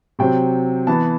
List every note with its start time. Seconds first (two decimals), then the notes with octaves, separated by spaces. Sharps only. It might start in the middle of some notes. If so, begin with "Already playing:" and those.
0.19 C3 F#3 C4 G5
0.87 E3 B3 A5